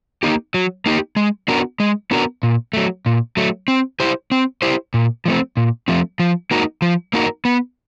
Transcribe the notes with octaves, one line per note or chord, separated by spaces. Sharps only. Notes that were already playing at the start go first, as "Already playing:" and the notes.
A#3 D#4 G4
F#3
A#3 D#4 G4
G#3
B3 D4 F#4 A#4
G#3
B3 D4 F#4 A#4
A#2
F#3 A3
A#2
F#3 A3
C4
E4 G4 C5
C4
E4 G4 C5
A#2
F3 A3 C4
A#2
F3 A3 C4
F3
A#3 D#4 F#4 A#4
F3
A#3 D#4 F#4 A#4
B3